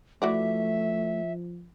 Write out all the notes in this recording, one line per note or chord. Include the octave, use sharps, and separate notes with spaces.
E3 F3 A3 F#4 D5 E5